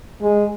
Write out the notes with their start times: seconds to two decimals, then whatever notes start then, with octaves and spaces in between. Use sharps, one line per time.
0.22 G#3